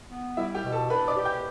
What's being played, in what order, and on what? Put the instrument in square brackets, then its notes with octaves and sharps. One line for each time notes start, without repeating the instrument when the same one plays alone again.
[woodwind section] B3
[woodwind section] G3 [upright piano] E4 E5
[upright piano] G4 G5
[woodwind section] B2
[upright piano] A4 A5
[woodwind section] D4 [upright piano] B4 B5
[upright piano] D5 D6
[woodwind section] G4
[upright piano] G5 G6